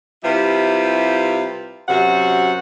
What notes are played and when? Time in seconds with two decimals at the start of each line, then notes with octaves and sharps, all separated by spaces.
0.24 C3 G3 E4 F4 B4
1.88 F#2 C3 F#4 F#5